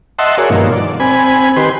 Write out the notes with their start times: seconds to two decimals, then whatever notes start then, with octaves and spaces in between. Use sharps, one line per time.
0.19 D#5 E5 F#5 A5 C6
0.38 F#4 G#4 A#4 C#5 D5
0.50 G2 B2 D#3 F3 A#3
0.72 D5
1.00 C4 G#5 B5
1.56 D#3 G4 B4 C6